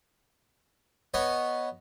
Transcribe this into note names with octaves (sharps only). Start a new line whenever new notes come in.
B3 C#5 D#5